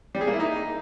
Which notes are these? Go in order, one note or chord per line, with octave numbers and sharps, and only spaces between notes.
G3
G#4
A#3
E4
D#4